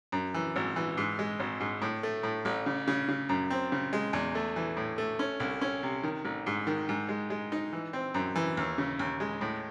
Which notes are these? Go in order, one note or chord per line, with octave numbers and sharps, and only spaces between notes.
F#2
E3
G#1
E3
G#2
G#3
G#1
G#2
A2
A3
A2
A1
C#3
C#3
C#3
F#2
C4
C#3
G#3
E2
A3
E3
A2
A3
C#4
C2
C#4
C3
D#3
A1
G#2
D#3
G#2
G#3
G#3
D#4
E3
C4
F#2
E3
D#2
C#3
D#2
G#3
A2